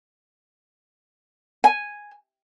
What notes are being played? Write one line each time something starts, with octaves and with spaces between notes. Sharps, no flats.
G#5